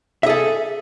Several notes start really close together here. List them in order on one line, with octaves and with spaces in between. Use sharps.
E5 G#4 A4